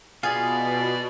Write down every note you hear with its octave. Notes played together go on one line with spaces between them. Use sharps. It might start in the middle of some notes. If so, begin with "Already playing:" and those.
B2 B3 F4 G#4 D5 F5